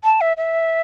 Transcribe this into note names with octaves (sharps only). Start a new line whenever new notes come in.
A5
E5
E5